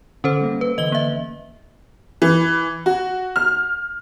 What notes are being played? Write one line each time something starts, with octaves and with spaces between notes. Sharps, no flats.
D3 C#4 A4 C5
G3 A#3
B4
D3 E3 D#5 G7
A#3 E5
E3
F#4
F6